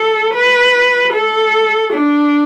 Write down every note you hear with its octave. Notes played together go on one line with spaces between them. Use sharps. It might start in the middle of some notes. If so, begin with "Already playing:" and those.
Already playing: A4
B4
A4
D4